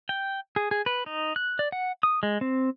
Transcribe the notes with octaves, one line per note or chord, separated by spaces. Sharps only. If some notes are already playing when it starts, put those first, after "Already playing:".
G5
G#4
G#4
B4
D#4
F#6
D5
F#5
D#6
G#3
C4